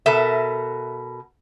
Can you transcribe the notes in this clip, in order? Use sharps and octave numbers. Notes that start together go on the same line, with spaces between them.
B2 A4 A#4 E5